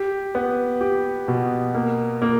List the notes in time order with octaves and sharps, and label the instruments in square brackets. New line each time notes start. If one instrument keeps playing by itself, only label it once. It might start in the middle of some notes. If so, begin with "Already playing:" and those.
Already playing: [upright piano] G4
B3
G4
B2
A#3
A#3